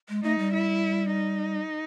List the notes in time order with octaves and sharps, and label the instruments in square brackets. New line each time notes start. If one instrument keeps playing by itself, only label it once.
[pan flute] G#3
[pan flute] A3 [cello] D#4
[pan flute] G3
[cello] E4
D#4